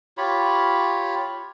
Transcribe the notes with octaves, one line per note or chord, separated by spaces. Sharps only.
F4 G4 C#5 B5